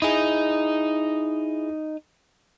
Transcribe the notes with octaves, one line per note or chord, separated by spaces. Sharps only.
D#4 E4 G#4